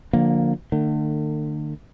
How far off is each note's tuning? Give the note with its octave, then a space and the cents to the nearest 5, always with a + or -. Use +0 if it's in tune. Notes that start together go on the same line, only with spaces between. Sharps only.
D3 +0 F3 +30 A#3 +0
D3 +45 A3 +40